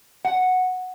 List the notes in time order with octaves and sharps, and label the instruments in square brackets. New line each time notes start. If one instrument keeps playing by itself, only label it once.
[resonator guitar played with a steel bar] F#5